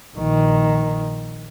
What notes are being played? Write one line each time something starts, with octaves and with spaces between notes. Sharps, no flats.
A#1 D#3